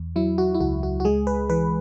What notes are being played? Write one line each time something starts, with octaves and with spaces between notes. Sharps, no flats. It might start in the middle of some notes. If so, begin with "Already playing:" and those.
Already playing: E2
F#3 E4
F#4
E4
C#2 F#4
F#4
F#4
G#3 G#4
B4
E3 B4